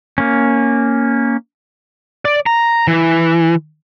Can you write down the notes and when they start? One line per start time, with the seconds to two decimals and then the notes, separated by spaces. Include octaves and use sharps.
0.18 A#3 C#4
2.25 D5
2.46 A#5
2.87 E3